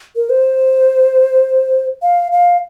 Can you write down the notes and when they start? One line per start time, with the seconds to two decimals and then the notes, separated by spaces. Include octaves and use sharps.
0.16 A#4
0.30 C5
2.02 F5
2.32 F5